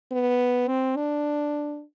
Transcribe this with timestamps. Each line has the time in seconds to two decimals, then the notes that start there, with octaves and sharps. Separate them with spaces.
0.12 B3
0.68 C4
0.96 D4